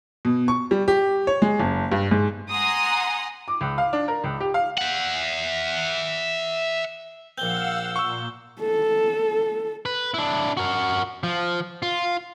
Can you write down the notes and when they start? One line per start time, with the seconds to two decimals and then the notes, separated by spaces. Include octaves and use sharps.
0.25 B2
0.48 C#6
0.71 G3
0.88 G4
1.27 C#5
1.42 G#3
1.60 F#1
1.92 G2
2.11 G#2
2.51 F#5 G#5 A#5 C6 D#6
3.48 D6
3.61 C#2
3.78 F5
3.93 D4
4.08 A#4
4.24 C#2
4.40 G4
4.54 F5
4.78 E5 F#5
7.38 A#1 C4 F5 F#5 E6 G6 G7
7.96 A#2 C#6 E6
8.61 A4
9.86 B4
10.14 D4 E4
10.57 F#4 A#4
11.24 F3
11.82 F4